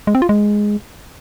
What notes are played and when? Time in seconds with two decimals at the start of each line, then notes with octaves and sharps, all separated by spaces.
0.07 G#3
0.15 C4
0.22 F4
0.29 G#3